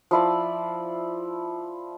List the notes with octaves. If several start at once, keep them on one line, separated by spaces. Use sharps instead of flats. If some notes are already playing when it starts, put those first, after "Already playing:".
F3 E4 D5